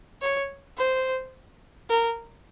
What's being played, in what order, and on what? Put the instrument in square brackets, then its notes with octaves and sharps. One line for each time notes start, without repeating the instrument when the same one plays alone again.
[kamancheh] C#5
C5
A#4